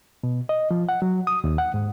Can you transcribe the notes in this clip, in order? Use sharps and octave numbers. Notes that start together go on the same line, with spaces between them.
B2
D#5
F3
F#5
F#3
D#6
D#2
F#5
G#2